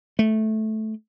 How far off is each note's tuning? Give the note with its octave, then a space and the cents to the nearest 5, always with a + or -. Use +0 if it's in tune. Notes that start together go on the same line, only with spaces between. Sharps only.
A3 -10